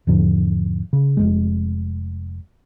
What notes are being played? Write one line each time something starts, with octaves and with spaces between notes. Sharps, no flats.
E2 G#2 D3 F3
C#3
F1 D#2 G#3